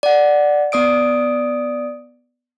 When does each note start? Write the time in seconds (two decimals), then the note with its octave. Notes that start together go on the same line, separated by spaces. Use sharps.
0.03 D5 F#5
0.72 B3 D5 D#6 D7